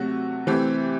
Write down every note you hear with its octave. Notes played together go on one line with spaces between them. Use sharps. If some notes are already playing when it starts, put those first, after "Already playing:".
Already playing: C3 F#3 A3 F#4
C3 E3 A3 C4 G4